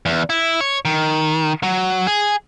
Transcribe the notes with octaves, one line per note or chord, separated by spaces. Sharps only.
E2
E4
C#5
D#3
F#3
G#4